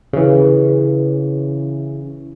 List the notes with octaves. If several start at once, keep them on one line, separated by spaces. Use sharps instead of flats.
C#3 E3